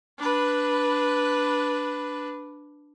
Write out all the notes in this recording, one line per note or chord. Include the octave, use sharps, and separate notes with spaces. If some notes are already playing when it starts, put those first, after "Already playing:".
D4 B4